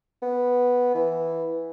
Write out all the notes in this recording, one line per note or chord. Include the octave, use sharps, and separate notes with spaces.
B3
E3